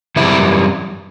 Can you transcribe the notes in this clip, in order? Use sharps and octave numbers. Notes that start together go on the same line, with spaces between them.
F#2 E3 G3 E4